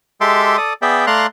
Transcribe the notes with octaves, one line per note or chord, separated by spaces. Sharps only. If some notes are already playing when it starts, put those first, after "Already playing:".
G#3 G4 A4 E5 C6 D6
A4 D5 D#6
B3 G#4 D5 E5 G5
A3 D5 F5 A#5 C6 F#6